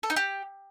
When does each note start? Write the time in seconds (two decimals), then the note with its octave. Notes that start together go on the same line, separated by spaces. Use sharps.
0.03 A4
0.10 D#4
0.16 G4